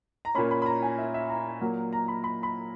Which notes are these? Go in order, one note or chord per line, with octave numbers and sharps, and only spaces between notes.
A#5
A#2 A#3 C#4 B5
B5
B5
A#5
G#5
E5
E5
A#5
A#2 F#3 A#3
A#5
B5
B5
B5